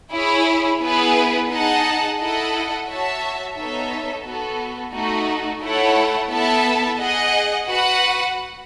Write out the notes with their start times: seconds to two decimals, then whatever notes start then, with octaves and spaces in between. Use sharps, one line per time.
0.13 E4 G#4 C#5
0.81 B3 E4 G#4 B4
1.50 D#4 G#4 D#5 F#5 A5
2.19 E4 A4 D#5 F#5
2.88 F#4 C#5 E5 A5
3.56 B3 D#4 A4 C#5 E5
4.24 B3 F#4 A4
4.93 A3 D#4 F#4
5.62 A3 E4 A4 C#5 F#5
6.30 B3 E4 A4 E5 A5
6.99 G#4 D#5 F#5
7.67 F#4 B4 F#5